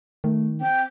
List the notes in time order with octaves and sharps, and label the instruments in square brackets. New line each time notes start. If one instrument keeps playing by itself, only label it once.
[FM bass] D#3 [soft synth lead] A3
[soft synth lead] C4 [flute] G5